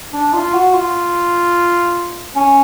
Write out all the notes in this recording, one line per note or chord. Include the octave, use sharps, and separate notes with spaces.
D4
F4
F#4
F4
C#4